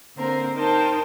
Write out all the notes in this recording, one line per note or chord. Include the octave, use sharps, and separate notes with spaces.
D3 A#3 C4 A#4 C5
D#4 A#4 C5 G5 A5